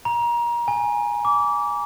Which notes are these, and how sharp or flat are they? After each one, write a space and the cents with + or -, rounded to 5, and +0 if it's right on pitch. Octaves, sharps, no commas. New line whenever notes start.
A#5 +30
G#5 -5
D6 -20